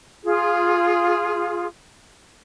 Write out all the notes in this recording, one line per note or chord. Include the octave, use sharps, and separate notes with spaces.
F4 G#4